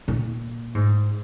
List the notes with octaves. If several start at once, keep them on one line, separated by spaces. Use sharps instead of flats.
A#2
G#2